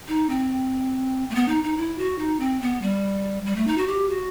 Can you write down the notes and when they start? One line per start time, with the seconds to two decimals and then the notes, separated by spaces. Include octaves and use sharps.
0.08 D#4
0.29 C4
1.30 A3
1.35 B3
1.48 D#4
1.63 D#4
1.77 E4
1.98 F#4
2.18 D#4
2.40 C4
2.61 B3
2.82 G3
3.46 G3
3.56 A3
3.67 D#4
3.77 F#4
3.87 G4
4.09 F#4